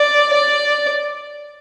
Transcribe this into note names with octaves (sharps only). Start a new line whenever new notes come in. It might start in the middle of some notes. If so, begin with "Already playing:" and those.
Already playing: D5
D5